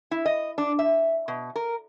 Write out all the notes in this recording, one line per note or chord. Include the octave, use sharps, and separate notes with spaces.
E4
D#5
D4
E5
B2
A#4